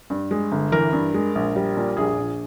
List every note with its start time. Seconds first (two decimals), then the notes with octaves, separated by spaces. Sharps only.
0.10 G2
0.31 G#3
0.52 G1
0.72 E3 A#4
0.93 G2
1.14 G#3
1.35 A#1
1.56 G3
1.77 A#2
1.97 A#1 G#4
2.18 A#1